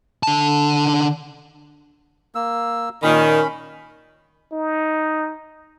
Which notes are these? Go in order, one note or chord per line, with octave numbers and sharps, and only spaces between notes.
D3 A5
A#3 E6
A#2 D#3 C#4 B5
D#4